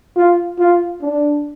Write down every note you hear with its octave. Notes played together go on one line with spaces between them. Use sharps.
F4
F4
D4